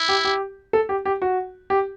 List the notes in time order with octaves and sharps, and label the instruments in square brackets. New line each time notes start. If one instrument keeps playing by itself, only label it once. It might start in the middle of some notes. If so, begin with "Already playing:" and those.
Already playing: [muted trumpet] E4
[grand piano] G4
G4
A4
G4
G4
F#4
G4